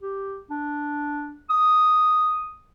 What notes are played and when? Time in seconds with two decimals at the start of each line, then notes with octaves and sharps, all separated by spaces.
0.02 G4
0.50 D4
1.50 D#6